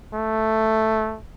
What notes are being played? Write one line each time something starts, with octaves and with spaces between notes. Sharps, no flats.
A3